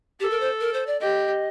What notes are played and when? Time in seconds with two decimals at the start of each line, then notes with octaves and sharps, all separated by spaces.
0.20 G4 A4
0.30 A#4
0.40 C5
0.60 A#4
0.74 C5
0.87 D5
1.00 G4 D#5